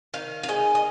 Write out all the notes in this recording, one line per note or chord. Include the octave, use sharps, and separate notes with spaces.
D#3 F5
F5
G#3 D#5
D#5